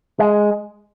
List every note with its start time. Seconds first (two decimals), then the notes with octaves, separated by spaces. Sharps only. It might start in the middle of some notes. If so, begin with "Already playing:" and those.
0.19 G#3